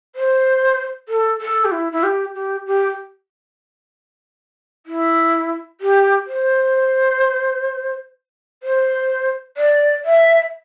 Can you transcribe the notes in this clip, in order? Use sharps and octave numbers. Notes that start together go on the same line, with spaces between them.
C5
A4
A4
G4
E4
E4
G4
G4
G4
E4
G4
C5
C5
D5
E5